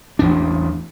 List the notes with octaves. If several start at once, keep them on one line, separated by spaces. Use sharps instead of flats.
A1 E2 D4